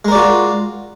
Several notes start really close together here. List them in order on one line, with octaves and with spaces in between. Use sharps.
G#3 A#4 D5 F#4 F4